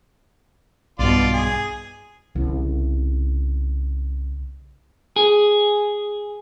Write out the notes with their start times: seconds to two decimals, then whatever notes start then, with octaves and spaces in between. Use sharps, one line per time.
0.99 B1 G2 B2 F4 D5 C6
1.33 G#4
2.35 C2 C#3
5.16 G#4